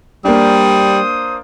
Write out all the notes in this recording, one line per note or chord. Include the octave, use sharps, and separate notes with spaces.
G3 A#3 D4 C5 D#6